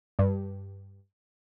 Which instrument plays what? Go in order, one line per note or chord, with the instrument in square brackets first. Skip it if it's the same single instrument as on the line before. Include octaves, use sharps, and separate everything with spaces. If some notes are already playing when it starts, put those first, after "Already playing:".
[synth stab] G2